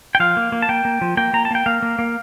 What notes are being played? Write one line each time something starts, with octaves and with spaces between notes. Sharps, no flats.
G5
F3 F5
A#3
A#3
A5
A#3 G5
A#3
F3
A#3 G5
A#3 A#5
A5
A#3 G5
A#3 F5
A#3
A#3